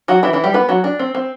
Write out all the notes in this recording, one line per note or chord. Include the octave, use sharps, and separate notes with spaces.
F#3 F#4
E3 E4
E3 E4
G3 G4
B3 B4
F#3 F#4
D4
C4
C4